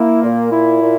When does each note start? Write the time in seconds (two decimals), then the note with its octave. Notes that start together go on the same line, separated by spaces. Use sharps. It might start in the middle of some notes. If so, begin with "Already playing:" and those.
Already playing: A#3 E4
0.22 A#2
0.52 E4
0.81 A#2